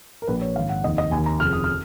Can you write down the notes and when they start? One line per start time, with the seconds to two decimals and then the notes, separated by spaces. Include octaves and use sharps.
0.22 A#4
0.27 A#1 A#2 B4
0.42 C#5
0.56 G#1 G#2 D#3 F5
0.69 F#5
0.84 F1 D#2 D#3 D#5
0.98 D#5
1.11 D#2 D#3 G#5
1.26 A#5
1.40 F1 F2 C#3 F6
1.53 D#6
1.64 F6